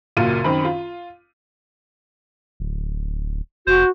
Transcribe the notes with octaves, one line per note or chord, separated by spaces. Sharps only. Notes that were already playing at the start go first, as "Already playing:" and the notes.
F#1 A#2 F#4 F5 D#7
F#2 D#3 C4 B5
F4
D1
F1 F#4 C5